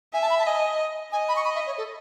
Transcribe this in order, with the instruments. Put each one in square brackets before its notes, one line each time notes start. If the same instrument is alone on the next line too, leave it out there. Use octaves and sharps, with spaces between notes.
[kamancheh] E5 [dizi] G#5
[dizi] A5
B5
A5
[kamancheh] D#5 [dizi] G#5
[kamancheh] D#5 [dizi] G#5
[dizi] B5
C#6
B5
E5
C#5
A4